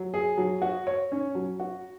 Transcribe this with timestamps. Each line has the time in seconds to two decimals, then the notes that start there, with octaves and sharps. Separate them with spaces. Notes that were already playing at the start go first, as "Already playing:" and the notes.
Already playing: F#3
0.14 G#4
0.38 F#3
0.62 F#4
0.87 C#5
1.12 C#4
1.35 F#3
1.60 F#4